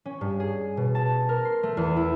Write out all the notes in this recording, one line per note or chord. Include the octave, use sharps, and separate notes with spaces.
C#4
G2
G#4
B2
A5
A#4
C6
A3
E2
E4